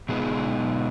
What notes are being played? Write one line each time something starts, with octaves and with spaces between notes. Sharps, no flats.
B2 G#3 B3 D#4 G#4